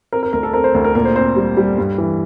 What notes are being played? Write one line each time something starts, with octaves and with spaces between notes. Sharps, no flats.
C4 A#4
A#4
D2 A#4
A4
C4 A#4
C5
D2 C5
A#4
A#2 A#4
C5
C4 C5
G3
G3
G2
E3